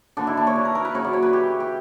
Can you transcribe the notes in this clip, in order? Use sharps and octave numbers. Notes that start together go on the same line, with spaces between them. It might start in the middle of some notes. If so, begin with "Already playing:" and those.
D3 A#3 C#4 D4
E4
D4
C#5
B4
A#4
A#4
B4
C#3 F#3 A#3 C#5
D5
C#5
B4
G4
G4